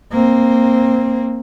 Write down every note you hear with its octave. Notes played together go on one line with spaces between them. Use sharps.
A#3 C4